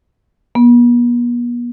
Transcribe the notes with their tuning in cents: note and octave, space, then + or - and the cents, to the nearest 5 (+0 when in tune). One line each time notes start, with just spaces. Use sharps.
B3 -45